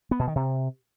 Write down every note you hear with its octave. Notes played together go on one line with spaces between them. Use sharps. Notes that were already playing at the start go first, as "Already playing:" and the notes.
B3
B2
D#3
C3